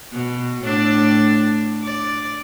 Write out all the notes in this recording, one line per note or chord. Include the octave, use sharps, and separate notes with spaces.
B2
A2 D4 D5
D5